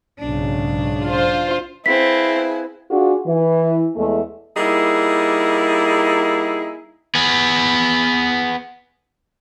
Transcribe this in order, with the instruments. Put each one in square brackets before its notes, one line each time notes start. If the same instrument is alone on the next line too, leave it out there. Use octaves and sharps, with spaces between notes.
[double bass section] B1 G#2 C#3 [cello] D4
[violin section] F4 C5
[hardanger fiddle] C4 [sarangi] E4 [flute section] G#4 B4 F5 [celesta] B6
[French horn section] D4 F4 F#4 G#4
E3
E2 G#3 A3
[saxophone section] G3 A#3 D#4 E4 G#4
[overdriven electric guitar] B3 G#4